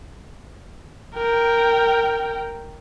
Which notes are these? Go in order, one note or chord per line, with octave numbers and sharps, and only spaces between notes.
A#4 G5